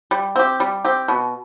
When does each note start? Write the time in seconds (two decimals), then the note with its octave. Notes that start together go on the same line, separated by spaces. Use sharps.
0.11 G3
0.36 C4 G4
0.60 G3
0.85 C4 G4
1.08 B2